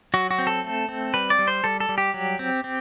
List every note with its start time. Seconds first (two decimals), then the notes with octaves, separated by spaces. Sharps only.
0.14 F#3 F#4
0.31 F#4
0.39 C4
0.47 A4
0.64 A3
0.89 C4
1.14 G3 B4
1.30 D5
1.39 G3
1.48 C5
1.64 G3 A4
1.80 A4
1.89 G3
1.98 G4
2.14 F#3
2.39 C4
2.64 C4